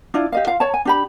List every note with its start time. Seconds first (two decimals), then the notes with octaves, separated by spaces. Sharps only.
0.14 D4 E4 F4
0.32 G4 D#5 F5
0.47 F4 F5
0.60 C#5 A5
0.74 G#5
0.85 D4 G4 B5